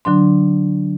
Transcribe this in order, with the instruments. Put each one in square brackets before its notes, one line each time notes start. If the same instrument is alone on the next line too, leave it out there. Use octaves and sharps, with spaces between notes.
[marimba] D3 F#3 D4 C6